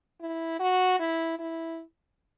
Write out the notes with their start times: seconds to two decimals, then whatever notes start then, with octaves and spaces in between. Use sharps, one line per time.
0.20 E4
0.59 F#4
0.99 E4
1.39 E4